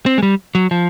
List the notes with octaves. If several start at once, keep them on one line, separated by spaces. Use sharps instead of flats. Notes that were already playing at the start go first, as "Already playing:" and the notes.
C4
G#3
G3
F#3
F3